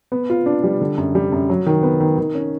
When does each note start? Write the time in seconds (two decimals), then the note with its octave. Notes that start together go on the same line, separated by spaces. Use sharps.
0.12 B3
0.30 F4
0.46 D4
0.64 G3
0.81 D3
0.97 F#2
1.15 G3
1.32 F#2
1.50 F#3
1.66 D#3
1.83 B3
2.00 D#3
2.18 D#3
2.35 C#4